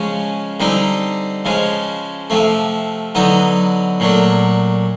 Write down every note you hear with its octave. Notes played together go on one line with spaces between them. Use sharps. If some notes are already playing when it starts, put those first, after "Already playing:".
Already playing: C#3 F3 G#3 C#4
D3 G3 C4 D#4
C#3 F3 G#3
C3 F3 A3
D3 F#3 B3 D#4
A#2 F#3 A3 D4